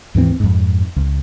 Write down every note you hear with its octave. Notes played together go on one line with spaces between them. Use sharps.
D#2 G#2 E3 C4
F2 G#2
C#2